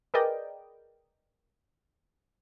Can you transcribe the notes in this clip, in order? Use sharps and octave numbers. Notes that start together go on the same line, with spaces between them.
G#4 A#4 B4 D5 D#5 G5